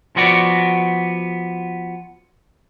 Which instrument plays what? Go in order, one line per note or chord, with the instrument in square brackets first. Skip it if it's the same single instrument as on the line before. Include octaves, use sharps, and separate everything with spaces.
[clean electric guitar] F3 B3 F#4 D5